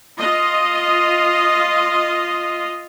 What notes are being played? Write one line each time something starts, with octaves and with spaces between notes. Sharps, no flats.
F4 D#5